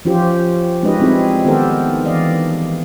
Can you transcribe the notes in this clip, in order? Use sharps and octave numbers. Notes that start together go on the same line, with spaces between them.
F3 C#4 F4 G4 C5
G#3 C#4 D#4 G4 B4 D#5
G3 C4 D#4 E4 G#4
D#3 B3 G4 A4 A#4 C5
E3 D5 D#5 F5